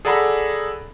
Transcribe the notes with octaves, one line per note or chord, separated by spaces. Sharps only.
G#4 A4 D5 F#5 A#5 B5